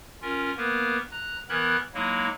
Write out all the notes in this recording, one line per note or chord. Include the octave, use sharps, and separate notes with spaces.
C#4 F4 A#4
A#3 B3 A#4 B4
A#5 F#6
E3 B3 A#4 B5 F#6 G#6
F#3 G#3 A#3 D#4 E4